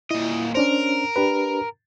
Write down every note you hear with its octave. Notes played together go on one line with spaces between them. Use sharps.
A#2 E4 D#5
C#4 D4 A#4 C5
D4 G4 B4